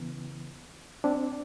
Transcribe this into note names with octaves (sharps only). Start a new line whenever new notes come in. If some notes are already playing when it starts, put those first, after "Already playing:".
Already playing: C#3 E3 B3
C4 D4